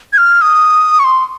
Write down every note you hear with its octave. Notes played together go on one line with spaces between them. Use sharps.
G#6
F6
D#6
C#6
C6